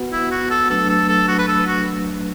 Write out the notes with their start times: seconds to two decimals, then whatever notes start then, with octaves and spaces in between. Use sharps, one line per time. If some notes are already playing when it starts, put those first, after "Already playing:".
Already playing: B3 F#4 B4 F#5
0.12 E4
0.31 F#4
0.50 A4
0.70 F#3 A3 D4 A4 B4
0.89 A4
1.08 A4
1.28 F#4
1.38 B4
1.47 A4
1.67 F#4